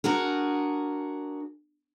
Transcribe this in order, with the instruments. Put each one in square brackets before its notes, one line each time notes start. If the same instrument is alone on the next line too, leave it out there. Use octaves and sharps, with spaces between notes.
[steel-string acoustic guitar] D4 F#4 G#4 A#4